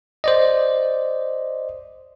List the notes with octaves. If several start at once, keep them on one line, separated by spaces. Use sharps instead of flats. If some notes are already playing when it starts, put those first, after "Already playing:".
C5 D5 D#5